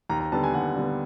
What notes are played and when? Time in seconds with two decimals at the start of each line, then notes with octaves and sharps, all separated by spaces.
0.09 D#2 A#5
0.20 A#5
0.32 D3 G3 B3 A5
0.44 G#5
0.54 D#2 F#5
0.76 D3 G3 B3